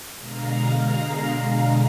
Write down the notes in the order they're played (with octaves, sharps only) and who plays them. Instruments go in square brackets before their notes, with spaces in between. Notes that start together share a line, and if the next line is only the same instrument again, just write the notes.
[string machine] B2 D3 G#3 F5 A#5